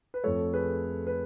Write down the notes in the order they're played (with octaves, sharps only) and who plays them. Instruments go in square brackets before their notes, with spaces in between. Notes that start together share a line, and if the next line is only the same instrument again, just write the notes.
[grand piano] B4
F2 F3 A3 A4 C#5
G#4 B4
B4